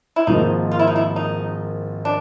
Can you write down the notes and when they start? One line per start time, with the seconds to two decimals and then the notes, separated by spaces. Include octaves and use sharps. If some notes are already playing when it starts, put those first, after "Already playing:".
0.16 E4
0.27 G#1 G#2 F3 A#3 D#4
0.72 F4
0.79 E4
0.87 D#4
0.96 E4
1.16 D#4
2.05 D4